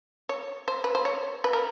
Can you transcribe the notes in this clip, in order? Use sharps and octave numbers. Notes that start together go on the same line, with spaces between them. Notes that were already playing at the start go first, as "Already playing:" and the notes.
C#5
C5
B4
C5
C#5
B4
A#4